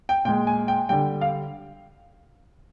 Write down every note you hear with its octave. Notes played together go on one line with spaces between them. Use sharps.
G5
A#2 G#3 G5
G#5
G5
D3 G3 G5
F5